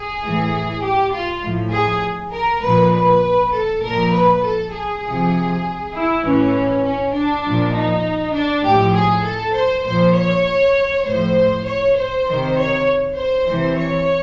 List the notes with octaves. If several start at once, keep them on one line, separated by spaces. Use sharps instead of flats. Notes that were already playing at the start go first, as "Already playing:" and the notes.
Already playing: G#4
A2 E3
G4
F4
A2 F3
G#4
A#4
A#2 F3 B4
B4
A4
A#2 F3 A#4
B4
A4
G#4
C3 F3
E4
A2 E3 C#4
C#4
D4
A#2 F3
D#4
D4
A2 F3 G4
G#4
A4
C5
A#2 F3 C5
C#5
A2 F3 C5
C#5
C5
C3 D#3
C#5
C5
C3 E3
C#5